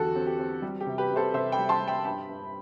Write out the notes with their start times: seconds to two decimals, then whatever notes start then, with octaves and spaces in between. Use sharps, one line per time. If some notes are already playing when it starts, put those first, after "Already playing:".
Already playing: E2 D3 F#3 F#4 G4 A4
0.16 C4
0.27 G4
0.39 C4
0.62 G3
0.81 G4
0.86 C3
0.98 G4 B4
1.11 C3
1.16 A4 C5
1.34 C3 C5 E5
1.52 G5 B5
1.58 G3
1.69 A5 C6
1.81 G3
1.88 G5 B5
2.05 G2 G5 B5
2.29 G2